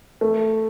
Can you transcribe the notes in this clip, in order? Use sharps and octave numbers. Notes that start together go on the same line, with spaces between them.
A3